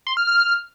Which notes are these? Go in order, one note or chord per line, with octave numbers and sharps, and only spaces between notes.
C6
F6
F6